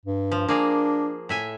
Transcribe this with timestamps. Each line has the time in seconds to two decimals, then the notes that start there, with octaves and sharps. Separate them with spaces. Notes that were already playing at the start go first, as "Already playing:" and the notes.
0.06 G2
0.32 F3
0.48 A#3 D4 G#4 A#5
1.29 A2 E5 G#5